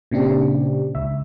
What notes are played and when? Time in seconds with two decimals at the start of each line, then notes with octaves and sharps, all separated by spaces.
0.11 A#2 C#3 C4 D4 G4
0.95 C#2 E5